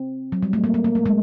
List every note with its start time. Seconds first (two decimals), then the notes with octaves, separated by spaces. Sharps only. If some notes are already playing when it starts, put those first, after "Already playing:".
Already playing: C4
0.32 F#3
0.43 G3
0.53 A3
0.64 A#3
0.74 A#3
0.84 A#3
0.95 A3
1.06 G#3